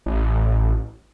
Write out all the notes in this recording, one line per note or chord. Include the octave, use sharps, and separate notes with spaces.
A1